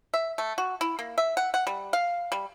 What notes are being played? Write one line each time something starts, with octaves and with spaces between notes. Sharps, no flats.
E5
A3
F#4
E4
A#3
E5
F#5
F#5
G3
F5
G3